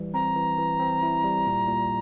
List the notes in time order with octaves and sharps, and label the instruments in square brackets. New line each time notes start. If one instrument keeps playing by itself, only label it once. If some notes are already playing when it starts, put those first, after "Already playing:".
Already playing: [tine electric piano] E3 G3
[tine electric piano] C4 [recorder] A#5
[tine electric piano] E3
E3
C4
E4
G3
A#2
A#2